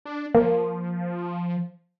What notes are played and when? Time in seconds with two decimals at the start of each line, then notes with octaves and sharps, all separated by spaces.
0.05 D4
0.35 F3 A#3